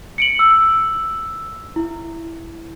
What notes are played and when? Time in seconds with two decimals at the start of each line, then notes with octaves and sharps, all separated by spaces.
0.18 C#7 D7 F#7
0.39 E6
1.76 E4